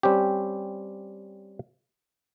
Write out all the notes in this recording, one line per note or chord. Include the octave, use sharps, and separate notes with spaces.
G3 C4 C#4 G4